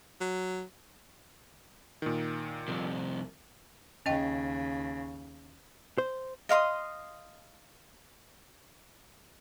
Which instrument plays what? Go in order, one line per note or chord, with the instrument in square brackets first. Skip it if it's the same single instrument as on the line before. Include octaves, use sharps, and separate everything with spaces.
[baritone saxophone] F#3
[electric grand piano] A#2 D#3
[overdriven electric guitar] C2 F2
[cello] D#2 C#3 [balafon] C#4 D#5 G5
[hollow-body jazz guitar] C5
[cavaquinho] D#5 F5 C6 D#6